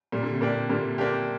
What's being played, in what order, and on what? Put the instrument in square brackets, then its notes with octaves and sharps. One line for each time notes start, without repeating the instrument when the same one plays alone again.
[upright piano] A#2 [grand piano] G3
[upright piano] D3
C3
[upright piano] A#2 [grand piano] A#3 D4 G4
[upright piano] A#2 D3 [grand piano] G3
[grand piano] A#3 D4 G4